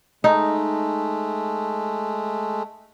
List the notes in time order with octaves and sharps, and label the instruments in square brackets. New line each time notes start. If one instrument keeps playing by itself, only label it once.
[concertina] G#3 A3 [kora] D#4